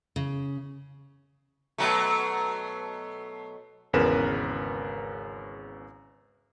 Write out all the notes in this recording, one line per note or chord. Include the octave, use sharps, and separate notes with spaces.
C#3
B2 F#3 A3
G#1 E2 C#3 A#4 B4 E7